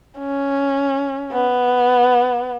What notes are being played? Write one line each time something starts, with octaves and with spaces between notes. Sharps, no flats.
C#4
B3